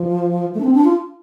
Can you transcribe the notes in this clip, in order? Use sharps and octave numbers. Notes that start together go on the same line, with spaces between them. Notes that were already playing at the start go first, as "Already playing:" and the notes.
Already playing: F3
A3
D4
C4
D4
F4